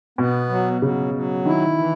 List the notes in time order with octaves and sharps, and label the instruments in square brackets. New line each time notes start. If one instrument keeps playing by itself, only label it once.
[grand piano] B2 [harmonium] B3
[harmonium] F#3
[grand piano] C#3 [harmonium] F#3
[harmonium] F#3
[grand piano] D#3 [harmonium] E4
[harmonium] E3